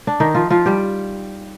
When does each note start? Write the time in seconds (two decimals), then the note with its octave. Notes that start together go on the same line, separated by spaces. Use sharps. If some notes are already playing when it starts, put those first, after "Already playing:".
0.07 D4
0.20 D#3 D#4
0.35 F3 F4
0.50 F3 F4
0.66 G3 G4